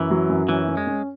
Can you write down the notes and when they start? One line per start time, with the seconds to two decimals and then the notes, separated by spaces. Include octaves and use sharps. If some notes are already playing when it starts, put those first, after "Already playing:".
Already playing: F#2 E3
0.11 F#3
0.29 F#2
0.49 E3 C#4
0.68 C#4
0.77 G#3
0.87 C#4